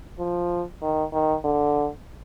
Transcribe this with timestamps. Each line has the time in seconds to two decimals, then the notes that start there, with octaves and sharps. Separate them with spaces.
0.19 F3
0.82 D#3
1.13 D#3
1.44 D3